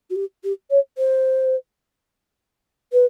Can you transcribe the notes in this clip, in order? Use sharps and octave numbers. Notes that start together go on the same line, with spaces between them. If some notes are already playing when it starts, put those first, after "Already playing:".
F#4
G4
G4
C#5
C5
B4